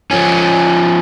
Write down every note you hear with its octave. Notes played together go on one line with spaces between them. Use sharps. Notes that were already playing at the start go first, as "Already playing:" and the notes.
F3 C#4